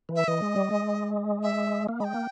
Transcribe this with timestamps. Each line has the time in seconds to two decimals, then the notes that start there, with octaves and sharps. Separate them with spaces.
0.09 E3
0.16 E5
0.28 E3 D#5
0.42 G#3
0.56 G3
0.71 G#3
1.43 E5
1.89 A#3
2.00 G#3 G5 B5
2.14 A#3